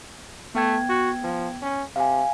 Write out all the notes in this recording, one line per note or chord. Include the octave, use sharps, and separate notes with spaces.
A3 B3 G5 G#6
F#4
F3
C#4
C3 F5 G#5